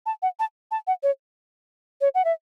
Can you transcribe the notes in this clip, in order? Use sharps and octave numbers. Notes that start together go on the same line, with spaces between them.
A5
F#5
A5
A5
F#5
C#5
C#5
F#5
E5